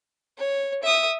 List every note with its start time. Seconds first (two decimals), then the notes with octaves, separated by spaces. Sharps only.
0.38 C#5
0.83 E5 D#6